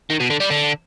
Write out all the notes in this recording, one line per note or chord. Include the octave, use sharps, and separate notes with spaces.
D#3
B2
D3
G3
D3